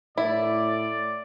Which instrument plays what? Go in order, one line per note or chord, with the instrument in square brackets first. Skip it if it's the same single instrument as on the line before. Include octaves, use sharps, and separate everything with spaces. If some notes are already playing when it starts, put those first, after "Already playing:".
[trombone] A2 [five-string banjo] E4 [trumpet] D5